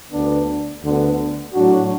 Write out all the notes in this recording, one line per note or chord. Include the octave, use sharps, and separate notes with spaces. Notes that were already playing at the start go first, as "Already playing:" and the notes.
D2 D3 B3 D4
D2 D3 B3
A2 F#3 D4 F#4